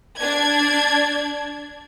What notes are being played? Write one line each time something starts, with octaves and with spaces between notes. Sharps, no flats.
D4 D5 G#6